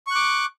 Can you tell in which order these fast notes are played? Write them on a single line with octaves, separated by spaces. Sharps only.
C#6 F#6 D6